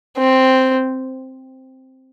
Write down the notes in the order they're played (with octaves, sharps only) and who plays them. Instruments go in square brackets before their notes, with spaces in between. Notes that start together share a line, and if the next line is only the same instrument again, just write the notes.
[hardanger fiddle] C4